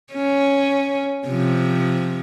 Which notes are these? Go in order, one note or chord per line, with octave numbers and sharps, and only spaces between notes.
C#4
C3 F3